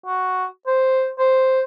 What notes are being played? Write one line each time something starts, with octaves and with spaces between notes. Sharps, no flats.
F#4
C5
C5